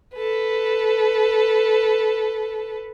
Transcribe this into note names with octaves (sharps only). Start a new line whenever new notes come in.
A4 B4